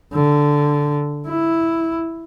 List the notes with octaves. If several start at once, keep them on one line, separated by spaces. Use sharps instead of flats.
D3
E4